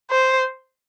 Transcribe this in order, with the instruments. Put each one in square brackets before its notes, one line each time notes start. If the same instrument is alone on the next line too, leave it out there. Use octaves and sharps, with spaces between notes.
[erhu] C5